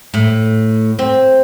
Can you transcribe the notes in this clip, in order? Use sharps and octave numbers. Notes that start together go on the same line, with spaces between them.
A2
C4